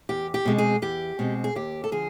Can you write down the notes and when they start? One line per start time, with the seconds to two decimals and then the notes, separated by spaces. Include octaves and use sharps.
0.09 E2 G4
0.34 G4
0.45 B2 G#3 C4
0.58 G#4
0.82 E2 G4
1.19 B2 G#3 C4
1.44 G#4
1.55 D#2 G4
1.84 A4
1.92 D3 F3 G#4